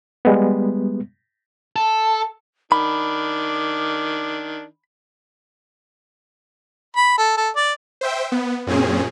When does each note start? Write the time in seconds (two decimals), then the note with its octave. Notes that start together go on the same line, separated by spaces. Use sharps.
0.25 G3 G#3 B3
1.76 A4
2.72 D#3 D4 B5 D6
6.96 B5
7.18 A4
7.37 A4
7.56 D5
8.01 C5 E5 G5
8.32 B3
8.67 F#2 A#2 C4 C#4 G#4